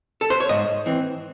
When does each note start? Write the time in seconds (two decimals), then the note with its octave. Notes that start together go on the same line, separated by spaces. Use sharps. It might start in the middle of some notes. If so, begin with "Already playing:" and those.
0.21 A4
0.30 C5
0.40 C#5
0.49 G#2 D#5
0.86 E3 C4